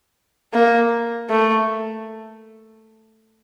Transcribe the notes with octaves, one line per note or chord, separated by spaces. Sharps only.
A#3
A3